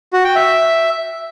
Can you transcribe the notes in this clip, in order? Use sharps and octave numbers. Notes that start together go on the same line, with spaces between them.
F#4
G5
E5